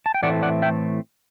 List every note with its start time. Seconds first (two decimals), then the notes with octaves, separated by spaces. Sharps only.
0.06 A5
0.14 G5
0.23 A2 E3 A3 C4 D5 F#5
0.42 D5 F#5
0.62 E5 G5